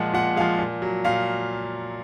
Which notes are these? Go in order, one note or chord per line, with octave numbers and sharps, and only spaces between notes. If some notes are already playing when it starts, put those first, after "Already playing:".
Already playing: A#2 F3 G#3 F#5
A#2 F#5
F3 G#3 F5
A#2
F#3
A#2 F5